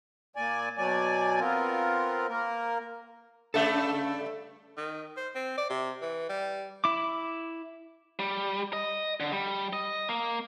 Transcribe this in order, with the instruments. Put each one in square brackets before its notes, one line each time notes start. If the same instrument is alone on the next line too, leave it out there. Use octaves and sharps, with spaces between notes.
[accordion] A#2 D5 G#5
B2 F#3 D5 G#5
B3 C4 F4 A#4
A#3 A#4
[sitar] G2 C#3 A3 [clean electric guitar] A4 E5
[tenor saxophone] D#3
C5
C4
D5
C3
E3
G3
[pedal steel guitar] E4 D6
[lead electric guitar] G3
D#5
D3
G3
D#5
A#3